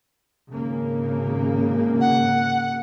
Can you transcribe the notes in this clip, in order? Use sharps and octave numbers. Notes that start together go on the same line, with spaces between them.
G#1 C#3 A#3
F#5